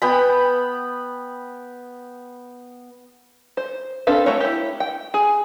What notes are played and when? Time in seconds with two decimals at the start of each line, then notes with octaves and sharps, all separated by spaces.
0.02 B3 G5 B5
3.57 C5
4.07 C4 D4 A4 B4 F5
4.26 A3 F#4 A#4 C#5
4.40 E4 G4
4.80 G5
5.14 G#4